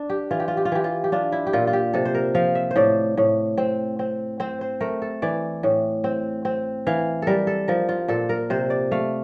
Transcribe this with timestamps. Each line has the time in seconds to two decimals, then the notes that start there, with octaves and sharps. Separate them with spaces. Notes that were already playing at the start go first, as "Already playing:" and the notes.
Already playing: D4
0.10 G4
0.31 E3 F4
0.40 G4
0.48 F4
0.57 G4
0.65 F4
0.72 E3 G4
0.84 F4
1.04 G4
1.12 D4 F4
1.32 E4
1.46 G4
1.53 A#2 F4
1.67 F4
1.73 G4
1.93 C3 A4
2.05 C5
2.14 A#4
2.35 F3 F5
2.55 E5
2.71 C5
2.76 A2 D5
3.17 A2
3.58 C4
3.99 C4
4.40 C4 C5
4.61 C5
4.80 A3 A#4
5.02 A4
5.22 E3 D5
5.63 A2
6.04 C4
6.45 C4
6.87 E3 F5
7.22 G3 A4 A#4
7.47 A4
7.68 F3 A#4
7.89 F4
8.08 A#2 A4
8.29 A#4
8.50 C3 C5
8.70 D5
8.91 A3 F5